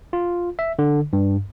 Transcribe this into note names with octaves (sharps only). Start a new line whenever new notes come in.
F4
E5
D3
G2